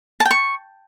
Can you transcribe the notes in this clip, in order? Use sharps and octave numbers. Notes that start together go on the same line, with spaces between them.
A5
G5
C#6